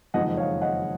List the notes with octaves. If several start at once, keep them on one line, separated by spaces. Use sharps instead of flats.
F#1 F2 D#3 G#3 D#4 D#5 F#5
C#5 F5
D#5 F#5